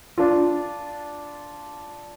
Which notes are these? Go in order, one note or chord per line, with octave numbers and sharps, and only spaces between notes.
D4 F4